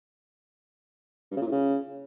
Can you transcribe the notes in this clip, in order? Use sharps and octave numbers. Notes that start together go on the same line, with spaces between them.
G2
C#3
A#2
A2
C#3